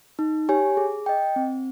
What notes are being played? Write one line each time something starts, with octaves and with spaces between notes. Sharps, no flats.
D#4
G4 C#5 G#5
G#4
D#5 G5
C4